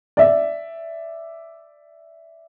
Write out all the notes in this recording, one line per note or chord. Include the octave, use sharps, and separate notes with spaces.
D5 E5